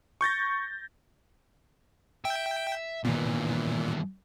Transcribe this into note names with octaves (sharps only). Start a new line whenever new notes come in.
C#6 G6 A6 A#6
E5 G5
G2 A#2 D#3 E3 A#3 B3